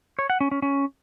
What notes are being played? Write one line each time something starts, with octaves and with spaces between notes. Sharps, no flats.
C#5
F#5
C#4
C#4
C#4